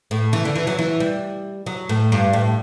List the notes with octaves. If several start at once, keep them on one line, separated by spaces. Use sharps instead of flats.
A2
E3
D3
E3
F#3
E3
G3
F#3
A2
G2
A2